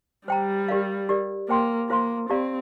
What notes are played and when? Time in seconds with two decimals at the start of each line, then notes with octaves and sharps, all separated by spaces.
0.28 G3 C5 G5 A#5
0.69 G4 A#4 D5 F5
1.09 G4 A#4 D5
1.49 A#3 C5 G5 C6
1.90 A#3 F4 C5 F5 C6
2.29 C4 G4 D5 F5 A#5